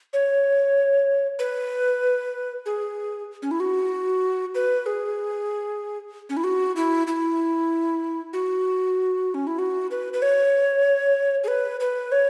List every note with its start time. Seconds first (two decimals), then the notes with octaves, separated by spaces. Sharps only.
0.13 C#5
1.39 B4
2.66 G#4
3.42 C#4
3.51 E4
3.60 F#4
4.55 B4
4.86 G#4
6.29 C#4
6.37 E4
6.44 F#4
6.76 E4
7.07 E4
8.33 F#4
9.34 C#4
9.47 E4
9.59 F#4
9.91 B4
10.13 B4
10.22 C#5
11.44 G#4
11.48 B4
11.80 B4
12.12 C#5